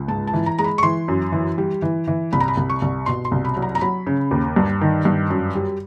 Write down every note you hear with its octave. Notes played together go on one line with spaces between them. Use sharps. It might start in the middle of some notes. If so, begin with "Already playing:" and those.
Already playing: C#2
G#2 A5
A5
E3
A#5
G#3 A#5
B5
C#6
E3 C6
F#2
E3
G3
E3
E3
C2 B5
A#5
B5
C2
C#6
C2
B2 C6
C6
C2
B5
F#3
A#5
A#5
F#3 B5
C#3
D#2
G2
D#3
G2
F#2
G3